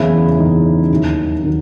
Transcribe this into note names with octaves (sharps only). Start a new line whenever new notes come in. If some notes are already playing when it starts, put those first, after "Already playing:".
Already playing: F#1 E2 C#3 E3 E4
F#1 E2 C#3 E3 D#4
D#2 D#3 F#3
D#3 F#3